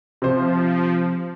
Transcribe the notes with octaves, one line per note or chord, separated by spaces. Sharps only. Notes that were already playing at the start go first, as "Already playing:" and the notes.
C3 F3 C5